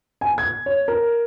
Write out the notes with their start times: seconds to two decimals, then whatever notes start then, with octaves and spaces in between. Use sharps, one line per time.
0.21 G#5
0.38 G#6
0.66 C#5
0.88 A#4